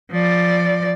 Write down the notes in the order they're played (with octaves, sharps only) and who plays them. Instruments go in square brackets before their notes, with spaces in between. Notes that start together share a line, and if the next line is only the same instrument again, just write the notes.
[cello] F3 D5